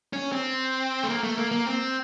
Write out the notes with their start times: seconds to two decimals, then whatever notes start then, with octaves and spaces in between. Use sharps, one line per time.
0.13 C#4
0.32 C4
1.04 A3
1.09 A#3
1.23 A3
1.38 A#3
1.52 A#3
1.66 C4